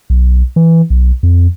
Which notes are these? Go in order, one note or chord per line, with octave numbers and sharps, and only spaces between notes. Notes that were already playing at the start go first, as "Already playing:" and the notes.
B1
E3
B1
F2